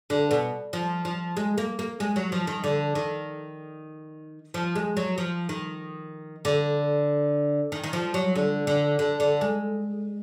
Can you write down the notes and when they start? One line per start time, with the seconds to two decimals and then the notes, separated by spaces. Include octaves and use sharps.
0.10 D3
0.31 B2
0.73 F3
1.05 F3
1.36 G#3
1.58 A#3
1.79 A#3
2.00 G#3
2.16 F#3
2.32 F3
2.47 D#3
2.64 D3
2.95 D#3
4.54 F3
4.76 G#3
4.97 F#3
5.18 F3
5.49 D#3
6.45 D3
7.72 D#3
7.84 D#3
7.93 F3
8.14 F#3
8.36 D3
8.67 D3
8.99 D3
9.20 D3
9.41 G#3